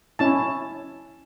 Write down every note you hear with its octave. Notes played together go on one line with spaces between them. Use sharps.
C#4 E4 A5